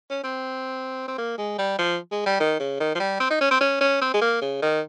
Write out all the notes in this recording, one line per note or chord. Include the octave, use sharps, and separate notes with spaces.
C#4
C4
C4
A#3
G#3
G3
F3
G#3
G3
D#3
C#3
D#3
F3
G3
C4
D#4
C#4
C4
C#4
C#4
C4
G#3
A#3
C#3
D#3